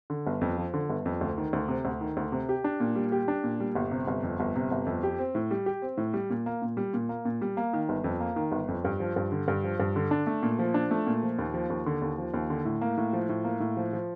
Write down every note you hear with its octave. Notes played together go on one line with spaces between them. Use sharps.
D3
G1
F2
F3
D3
G1
F2
D2
D#3
D2
C3
D2
D#3
D2
C3
G4
D4
A#2
G3
G4
D4
A#2
G3
G1
C3
G1
F2
G1
C3
G1
F2
G4
C4
A2
G3
G4
C4
A2
G3
A#2
A#3
A#2
G3
A#2
A#3
A#2
G3
A#3
D#3
G1
F2
A#3
D#3
G1
F2
G2
F3
G2
D3
G2
F3
G2
D3
D4
A3
A#2
F3
D4
A3
A#2
F3
D#2
F3
D#2
D3
D#2
F3
D#2
D3
A2
A#3
A2
F3
A2
A#3
A2
F3
F3